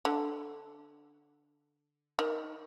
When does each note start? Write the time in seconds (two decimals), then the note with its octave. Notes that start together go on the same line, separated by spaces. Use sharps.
0.05 D3
2.19 D#3